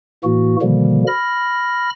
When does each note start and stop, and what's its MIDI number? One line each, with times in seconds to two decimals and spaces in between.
0.24 0.56 45
0.24 0.56 52
0.24 0.56 58
0.24 0.56 66
0.62 1.04 47
0.62 1.04 50
0.62 1.04 51
0.62 1.04 53
0.62 1.04 55
0.62 1.04 58
1.07 1.90 83
1.07 1.90 89
1.07 1.90 94